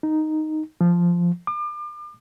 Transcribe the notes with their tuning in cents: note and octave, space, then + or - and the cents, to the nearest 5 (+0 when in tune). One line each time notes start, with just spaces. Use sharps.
D#4 -5
F3 -5
D6 +35